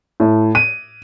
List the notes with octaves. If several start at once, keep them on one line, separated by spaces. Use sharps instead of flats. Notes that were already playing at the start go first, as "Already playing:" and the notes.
A2
D#7